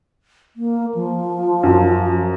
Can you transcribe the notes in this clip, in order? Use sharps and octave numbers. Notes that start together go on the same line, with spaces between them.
A#3
F3
F#2